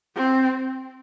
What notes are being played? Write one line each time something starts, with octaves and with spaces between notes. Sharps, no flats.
C4